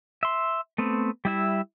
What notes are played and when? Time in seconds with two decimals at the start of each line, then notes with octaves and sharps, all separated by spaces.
0.23 E5 C6
0.78 A3 B3 C4
1.25 G3 E4 E5